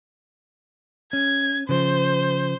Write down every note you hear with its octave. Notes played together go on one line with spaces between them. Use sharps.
C#4 G#6
C#3 F3 C5